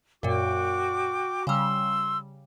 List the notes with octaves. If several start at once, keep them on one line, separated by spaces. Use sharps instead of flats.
F#2 A#2 F#4 G5 D6
C#3 G3 C6 E6